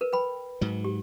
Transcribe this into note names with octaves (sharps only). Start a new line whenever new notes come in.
A#4 B4
B4 G5 B5
G#2 F#3
G4